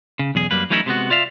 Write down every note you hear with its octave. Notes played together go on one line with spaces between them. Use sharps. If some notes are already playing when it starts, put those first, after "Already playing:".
C#3
B1 E2 G#4
F#2 G3 A#3 B4
E3 F#3 A3 C#4 D#4 E4
C3 G#3 B3 F#4
F4 D5 E5 F5